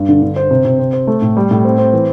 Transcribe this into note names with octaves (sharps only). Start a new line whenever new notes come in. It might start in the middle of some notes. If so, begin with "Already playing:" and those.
Already playing: G2
D3
D3
C5
C3
C3
C4
C4
A3
A2
G3
A2
C4
C4
E3